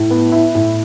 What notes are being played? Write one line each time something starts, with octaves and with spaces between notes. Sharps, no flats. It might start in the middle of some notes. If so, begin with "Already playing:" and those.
Already playing: A2
B3
E4
A2